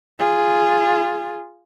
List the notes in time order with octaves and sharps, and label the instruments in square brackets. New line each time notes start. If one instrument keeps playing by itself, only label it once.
[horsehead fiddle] F4 G#4